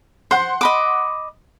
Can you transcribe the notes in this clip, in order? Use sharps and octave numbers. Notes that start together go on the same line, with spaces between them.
C5 F#5 C6
D#5 B5 D6